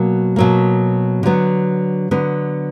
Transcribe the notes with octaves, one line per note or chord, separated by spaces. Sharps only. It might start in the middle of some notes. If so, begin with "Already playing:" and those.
Already playing: B2 F#3 A#3
B2 F#3 A#3
D3 F#3 B3
D3 F#3 B3